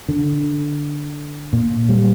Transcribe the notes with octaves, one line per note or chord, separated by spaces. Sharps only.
D3
A#2
G3